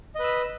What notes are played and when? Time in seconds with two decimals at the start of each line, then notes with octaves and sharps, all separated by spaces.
0.15 D#5
0.19 B4
0.24 E6
0.28 B5